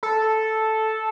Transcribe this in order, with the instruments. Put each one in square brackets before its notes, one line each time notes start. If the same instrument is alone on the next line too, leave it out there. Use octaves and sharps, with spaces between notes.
[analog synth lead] A4